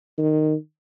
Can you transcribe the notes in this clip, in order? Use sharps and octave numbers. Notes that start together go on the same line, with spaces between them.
D#3